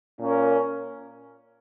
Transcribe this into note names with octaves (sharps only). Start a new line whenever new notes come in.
A#2 A#3 C#4 A#4